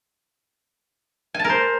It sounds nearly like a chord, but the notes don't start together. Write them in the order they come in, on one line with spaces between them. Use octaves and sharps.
G#5 A5 A#4 C5